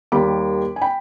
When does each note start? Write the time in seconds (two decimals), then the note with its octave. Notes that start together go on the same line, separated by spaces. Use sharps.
0.12 D#2 D#3 G3 B5 D6
0.76 G#5
0.81 G5 B5